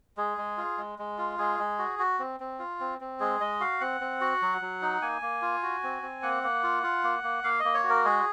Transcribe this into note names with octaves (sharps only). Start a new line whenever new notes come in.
G#3 G#4
G#3
F4
G#3
G#3
F4
G#3 G#4
G#3
F#4
F#4
C4
C4
F4
C4
C4
G#3 G#4
G#3 D#5
F#4 F5
C4 F#5
C4
F#4
F#3
F#3
D#4
A#3 G#5
A#3
F4
F#4
C4
C4
A#3 F#5
A#3
F4
F4
A#3
A#3
A#3 F5
D#5
A#3
C#5
F#4
A#4
G#3 G#4